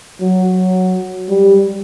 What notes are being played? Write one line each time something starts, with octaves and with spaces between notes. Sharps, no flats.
F#3
G3